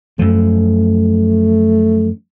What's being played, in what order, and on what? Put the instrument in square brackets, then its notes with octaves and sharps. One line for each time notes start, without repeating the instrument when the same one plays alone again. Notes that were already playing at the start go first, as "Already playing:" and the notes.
[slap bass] F#2 F3 [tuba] A3